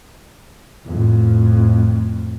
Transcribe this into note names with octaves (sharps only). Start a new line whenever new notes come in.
F2 A2